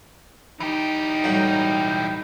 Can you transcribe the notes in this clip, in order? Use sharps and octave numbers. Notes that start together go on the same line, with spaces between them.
E3 D#4 G4
A2 F#3 G3 G5